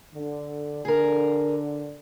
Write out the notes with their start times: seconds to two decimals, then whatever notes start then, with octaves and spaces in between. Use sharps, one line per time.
0.14 D3
0.85 D3 G#4 A#4